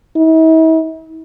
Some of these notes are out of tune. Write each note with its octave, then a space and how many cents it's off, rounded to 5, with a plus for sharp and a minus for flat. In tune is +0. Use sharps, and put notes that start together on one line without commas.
E4 -45